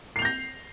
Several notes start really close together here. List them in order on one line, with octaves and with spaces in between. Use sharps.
C7 F7 G6 A#6